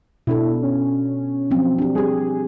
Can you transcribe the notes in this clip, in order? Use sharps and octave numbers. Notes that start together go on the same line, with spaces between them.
B2 D4 E4 A4
C#4
F3 F#3 C4
D4 G4
G3 G4 G#4